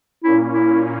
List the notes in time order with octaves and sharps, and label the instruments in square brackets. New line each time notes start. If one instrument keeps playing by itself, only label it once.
[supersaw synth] A#2 A#3 C#4 [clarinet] E4
[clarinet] E4